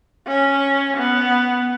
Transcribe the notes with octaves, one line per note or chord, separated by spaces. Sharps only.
C#4
B3